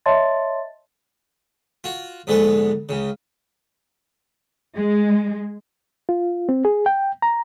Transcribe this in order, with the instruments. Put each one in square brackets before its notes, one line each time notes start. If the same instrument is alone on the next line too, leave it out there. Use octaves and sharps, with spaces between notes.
[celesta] C#5 D#5 E5 A5 C6 A6
[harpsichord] F4 F#4
A#1 G#2 D3 G#3 B3 B4
C#2 C#3
[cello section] G#3
[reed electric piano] F4
C4
G#4
G5
A#5